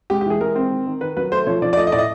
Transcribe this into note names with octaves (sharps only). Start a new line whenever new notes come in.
G#3 G4
G4
E3 G#4
G#3 A#4
C4
D#3
D#3
D#3 B4
F#3 B4
A3 C5
F3 C#5
F3 D5
D5
A3 D#5
D#5
A2 D5
D#5